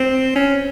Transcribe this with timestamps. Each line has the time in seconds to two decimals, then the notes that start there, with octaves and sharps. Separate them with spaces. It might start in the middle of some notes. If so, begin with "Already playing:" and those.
Already playing: C4
0.36 C#4